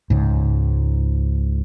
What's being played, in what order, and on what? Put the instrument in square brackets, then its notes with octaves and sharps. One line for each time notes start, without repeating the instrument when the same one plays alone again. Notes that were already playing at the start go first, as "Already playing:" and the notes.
[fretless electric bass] C#2 G#2